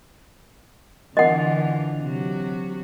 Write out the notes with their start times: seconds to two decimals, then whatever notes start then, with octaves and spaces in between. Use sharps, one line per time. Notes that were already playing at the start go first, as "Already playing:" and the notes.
1.17 D3 E3 F4 D#5 F#5
2.02 C3 F#3 F#4